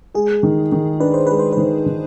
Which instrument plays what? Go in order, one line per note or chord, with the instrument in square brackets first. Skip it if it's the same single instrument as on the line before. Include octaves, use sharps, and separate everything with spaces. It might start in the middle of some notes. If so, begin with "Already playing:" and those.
[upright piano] G#3 [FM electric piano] G#4
[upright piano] D#3
D#3
[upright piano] D4 [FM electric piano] B4
[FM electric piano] C5
[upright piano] G#3 [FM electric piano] B4
[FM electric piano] C5
[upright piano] D#3 [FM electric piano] B4
[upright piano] D#3